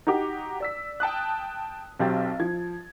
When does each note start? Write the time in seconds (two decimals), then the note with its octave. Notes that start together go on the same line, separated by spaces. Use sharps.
0.07 D#4 F#4 G4 D6
0.60 D5 E6 B6
1.00 G5 A5 D#6 F#6
1.99 B1 F#3 C4 G4 G5 A6
2.40 F3 G#6